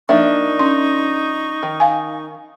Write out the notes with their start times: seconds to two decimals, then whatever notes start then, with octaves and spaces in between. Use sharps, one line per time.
0.09 F3 A#3 D4 D#4 E5 C#6
0.59 C#4 C6
1.63 D#3
1.80 F5 G#5